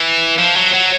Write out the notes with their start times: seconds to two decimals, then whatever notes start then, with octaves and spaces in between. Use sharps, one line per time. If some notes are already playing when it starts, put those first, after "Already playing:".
Already playing: E3
0.38 F3
0.56 F#3
0.74 F#3